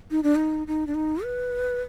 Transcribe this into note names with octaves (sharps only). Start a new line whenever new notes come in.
D#4
D4
D#4
D#4
D4
D#4
B4